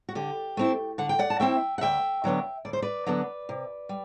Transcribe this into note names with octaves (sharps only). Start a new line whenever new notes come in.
F#4
D3 G4
A3 C4 E4
D3 F#5
G5
D5 F#5
A5
A3 C4 E4 E5 G5
F#5
D2 E5 G5
D3 F#3 B3 D4
D2 D5
C5
B4 D5
D3 F#3 B3 D4
C3
G3